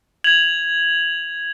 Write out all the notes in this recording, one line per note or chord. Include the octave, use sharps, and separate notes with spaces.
G#6 F7 F#7